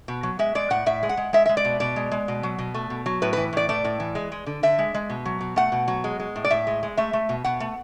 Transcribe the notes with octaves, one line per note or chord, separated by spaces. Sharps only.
B2
F#3
G#3 E5
G#3 D5
A2 F#5
A2 E5
G#3
F#5
G#3
G#3 E5
G#3 E5
D5
B2
B2 D5
G#3
G#3
B2
F#3
B2
A3
B2
F#3
A2 B4
E3 B4
A2 D5
A3 D5
A2
E3
G#3
G#3
D3
D3 E5
G#3
G#3
B2
F#3
B2
A3 F#5
B2
F#3
G#3
G#3
A2
D5
A2 E5
G#3
G#3
A3 E5
A3
B2
B2 F#5
A3